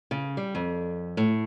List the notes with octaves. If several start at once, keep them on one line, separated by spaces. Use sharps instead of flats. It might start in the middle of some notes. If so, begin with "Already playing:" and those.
C#3
G3
F2
A2